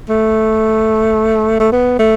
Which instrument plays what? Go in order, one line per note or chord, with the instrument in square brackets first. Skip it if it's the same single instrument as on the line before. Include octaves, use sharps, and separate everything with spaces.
[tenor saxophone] A3
A3
B3
A3